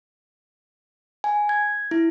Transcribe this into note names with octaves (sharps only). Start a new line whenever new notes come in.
G#5
G#6
E4